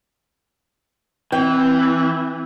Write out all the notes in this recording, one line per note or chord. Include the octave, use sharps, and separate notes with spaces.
E3 C4 G5